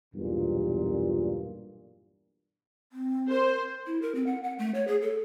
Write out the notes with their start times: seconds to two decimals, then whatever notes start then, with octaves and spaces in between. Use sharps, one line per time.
0.14 B1 E2 G2 A#2
2.93 C4
3.30 A#4 C5
3.87 E4
4.02 A#4
4.15 C4
4.26 F#5
4.44 F#5
4.59 A3
4.74 C#5
4.88 G#4
5.02 A4